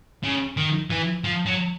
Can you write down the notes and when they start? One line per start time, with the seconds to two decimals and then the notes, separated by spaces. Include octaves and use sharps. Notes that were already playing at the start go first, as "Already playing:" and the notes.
0.24 C#3
0.57 D#3
0.90 E3
1.24 F3
1.46 F#3